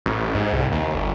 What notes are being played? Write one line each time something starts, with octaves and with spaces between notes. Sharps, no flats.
A1
G#2
C2
D#2
G1